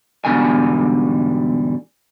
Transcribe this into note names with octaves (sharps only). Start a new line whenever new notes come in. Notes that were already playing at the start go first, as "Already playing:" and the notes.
E2 G#2 B2 D3 G3 G#5